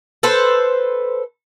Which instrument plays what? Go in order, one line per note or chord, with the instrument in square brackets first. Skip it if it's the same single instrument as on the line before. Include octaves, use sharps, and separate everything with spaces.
[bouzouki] A4 B4 C5